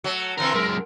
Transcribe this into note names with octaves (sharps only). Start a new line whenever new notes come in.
F#3 A3
D3 E3 C4 A#4
F#2 G#3 A#4